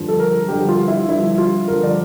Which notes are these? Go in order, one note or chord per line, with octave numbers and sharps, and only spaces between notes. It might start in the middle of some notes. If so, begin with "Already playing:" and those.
Already playing: G2 D3 F3
A4
A#4
G2 D3 F3 G4
F4
E4
G2 D3 F3 E4
F4
G2 D3 F3 A#4
D5